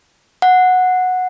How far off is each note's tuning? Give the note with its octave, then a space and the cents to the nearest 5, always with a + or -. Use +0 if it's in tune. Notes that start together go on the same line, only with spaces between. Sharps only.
F#5 -10